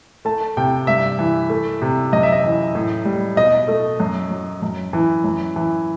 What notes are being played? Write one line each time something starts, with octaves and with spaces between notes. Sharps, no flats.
A3 A5
C3 G5
G2 E5
E3
A3
C3
F#2 D#5
E5
D#5
E3
A2
G3
B2 D#5
A3
F#2
F#3
F#2
E3
F#2
E3